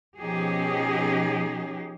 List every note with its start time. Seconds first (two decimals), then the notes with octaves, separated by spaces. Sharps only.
0.19 B2 F3 C#4 D#4 G4 G#4